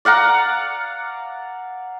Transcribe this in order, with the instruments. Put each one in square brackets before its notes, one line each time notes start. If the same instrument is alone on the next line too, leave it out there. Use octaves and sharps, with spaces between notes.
[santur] D5 F5 F#5 A#5